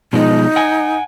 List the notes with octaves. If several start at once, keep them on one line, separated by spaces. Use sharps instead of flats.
B2 F3 G#3 D#4
F#5 G#5